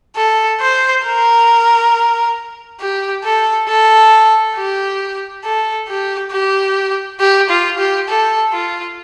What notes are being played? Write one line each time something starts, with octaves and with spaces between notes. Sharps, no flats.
A4
C5
A#4
G4
A4
A4
G4
A4
G4
G4
G4
F4
G4
A4
F4